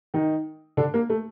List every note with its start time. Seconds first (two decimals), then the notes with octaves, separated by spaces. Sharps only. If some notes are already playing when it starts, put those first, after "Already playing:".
0.14 D#3 D#4
0.77 D3 D4
0.94 A#3
1.10 A3